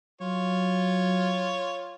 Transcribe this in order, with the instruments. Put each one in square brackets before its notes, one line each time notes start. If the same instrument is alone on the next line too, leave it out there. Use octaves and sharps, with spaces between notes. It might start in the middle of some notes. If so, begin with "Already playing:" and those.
[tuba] F#3 [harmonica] F4 C#5